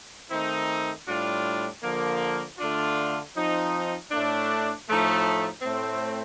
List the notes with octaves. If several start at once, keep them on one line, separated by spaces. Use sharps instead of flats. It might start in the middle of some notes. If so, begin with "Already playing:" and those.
D#3 A3 C4 D#4
A2 G3 D4 F4
D3 F3 A#3
D3 A3 D4 F4
F3 C4 D#4
A2 A3 D4
A2 F3 A3 D#4
A2 A3 C4